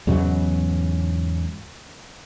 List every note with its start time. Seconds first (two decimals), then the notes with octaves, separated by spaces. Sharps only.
0.07 E2 G#2 C#3 F#3